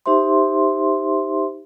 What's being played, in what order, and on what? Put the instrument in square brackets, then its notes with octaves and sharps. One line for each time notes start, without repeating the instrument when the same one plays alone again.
[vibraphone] D#4 G4 C5 E5 C6